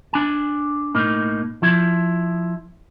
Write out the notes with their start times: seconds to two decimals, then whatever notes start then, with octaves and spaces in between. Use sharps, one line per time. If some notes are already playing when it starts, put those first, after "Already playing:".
0.13 D4 G#5
0.95 A2 A#3 D#4
1.62 F3 E4